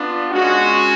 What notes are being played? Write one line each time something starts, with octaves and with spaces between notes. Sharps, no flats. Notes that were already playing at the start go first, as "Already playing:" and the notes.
Already playing: B3 D4 F4
G#3 C#4 F#4